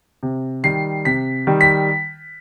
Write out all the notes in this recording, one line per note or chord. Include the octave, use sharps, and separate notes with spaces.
C3
D#3 G3 C7
C3 B6
D#3 G3
B6